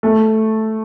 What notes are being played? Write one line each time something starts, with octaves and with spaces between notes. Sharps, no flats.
A3